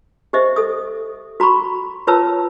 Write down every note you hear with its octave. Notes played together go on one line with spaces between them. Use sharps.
G4 C5 D#5 E5
A4 D#6
F#4 A#5 B5 C#6
F4 B4 C#5 A5 A#5 E6